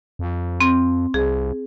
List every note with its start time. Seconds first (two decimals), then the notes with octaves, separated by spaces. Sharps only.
0.19 F2
0.61 C4
1.14 C2 G#4